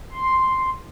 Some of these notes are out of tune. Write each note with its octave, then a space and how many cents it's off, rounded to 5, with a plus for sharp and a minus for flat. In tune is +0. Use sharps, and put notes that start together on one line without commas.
C6 +0